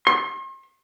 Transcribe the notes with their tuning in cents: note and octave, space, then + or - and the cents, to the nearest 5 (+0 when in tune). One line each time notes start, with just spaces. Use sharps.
C6 +40